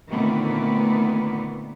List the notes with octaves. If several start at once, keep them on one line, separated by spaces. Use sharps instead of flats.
A#2 D3 D#3 A3 B3 C4